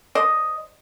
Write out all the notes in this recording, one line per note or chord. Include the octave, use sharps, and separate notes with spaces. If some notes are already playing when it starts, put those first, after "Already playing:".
C5 D5 D#5